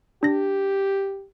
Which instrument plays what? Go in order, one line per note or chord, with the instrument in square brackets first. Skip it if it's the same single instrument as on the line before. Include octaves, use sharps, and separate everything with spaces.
[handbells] D4 A#6 [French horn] G4